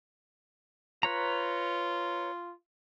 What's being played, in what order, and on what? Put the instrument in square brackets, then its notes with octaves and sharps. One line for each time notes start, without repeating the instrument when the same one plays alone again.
[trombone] F4 [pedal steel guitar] B4 C#5 A#5